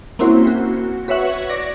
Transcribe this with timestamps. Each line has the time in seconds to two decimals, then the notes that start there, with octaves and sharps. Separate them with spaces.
0.19 A#3 C4 C#4 E4 F#4 C5
0.47 F#4
1.08 F#4 B4 C#5 E5 F#5 C#6
1.49 D5 A#6